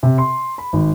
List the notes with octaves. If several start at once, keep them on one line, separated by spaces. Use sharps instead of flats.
C3
C6
B5
G#1